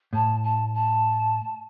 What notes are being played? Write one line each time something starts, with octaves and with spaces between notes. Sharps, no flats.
A2 A5
A5
A5